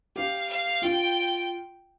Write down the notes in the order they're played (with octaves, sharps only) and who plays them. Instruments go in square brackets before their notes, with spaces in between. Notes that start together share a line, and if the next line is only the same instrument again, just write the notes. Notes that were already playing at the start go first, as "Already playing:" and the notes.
[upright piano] G4 [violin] F5
[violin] F5
[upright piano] F4 [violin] G5